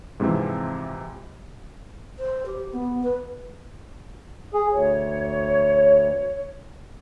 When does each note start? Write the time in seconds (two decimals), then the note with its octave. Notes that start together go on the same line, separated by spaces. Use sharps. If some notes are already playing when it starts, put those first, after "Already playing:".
0.20 G#2 C3 E3 F3 C4
2.19 C5
2.46 G4
2.73 B3
3.03 B4
4.54 G#4
4.71 D2 C#5